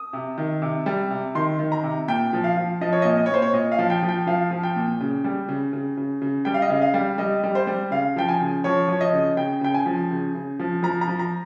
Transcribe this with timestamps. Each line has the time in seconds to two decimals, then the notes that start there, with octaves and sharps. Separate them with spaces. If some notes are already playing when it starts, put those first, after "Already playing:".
Already playing: D#6
0.13 C3
0.38 D#3
0.62 C3
0.86 G3
1.10 C3
1.35 D#3 C6
1.59 D#3
1.72 A#5
1.83 C3
2.08 A#2 G5
2.33 F3
2.44 F5
2.57 F3
2.81 F3 D#5
2.93 C#5
3.02 A#2 D#5
3.17 D#5
3.26 C#5
3.30 A#2 C5
3.42 C#5
3.53 A#2 D#5
3.72 F5
3.79 F3
3.90 G5
4.03 F3
4.09 G5
4.27 F3 F5
4.51 F3
4.63 G5
4.76 A#2
5.00 C#3
5.24 G3
5.49 C#3
5.73 C#3
5.97 C#3
6.22 C#3
6.45 G3 G5
6.54 F5
6.62 D#5
6.70 C#3 F5
6.82 F5
6.94 G3
7.18 G3 D#5
7.44 G3
7.55 C5
7.67 G3
7.91 C#3 F5
8.16 F3 G5
8.29 G#5
8.40 C#3
8.64 F3 C#5
8.88 F3 C#5
9.01 D#5
9.13 C#3
9.37 C#3 G5
9.61 C#3 G5
9.74 G#5
9.86 F3
10.11 C#3
10.35 C#3
10.59 F3
10.83 F3 A#5
11.01 A#5
11.08 F3
11.19 A#5